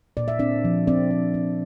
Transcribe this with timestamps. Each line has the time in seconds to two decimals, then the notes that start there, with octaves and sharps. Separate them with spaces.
0.17 A#2 D5
0.28 E5
0.39 C4 D4 D5
0.64 F3
0.87 C4 D4 D5
1.11 C4
1.34 C4